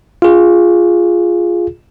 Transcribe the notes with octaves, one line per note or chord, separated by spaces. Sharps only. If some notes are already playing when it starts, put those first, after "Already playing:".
F4 G#4